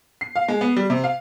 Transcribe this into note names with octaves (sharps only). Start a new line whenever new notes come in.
C7
F5
G#3
B3
G3
C3
F5